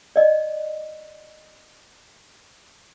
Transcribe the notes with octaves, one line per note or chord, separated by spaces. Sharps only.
D5 D#5